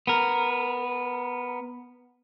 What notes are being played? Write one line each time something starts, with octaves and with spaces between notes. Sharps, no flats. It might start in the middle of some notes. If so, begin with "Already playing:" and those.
B3 A#4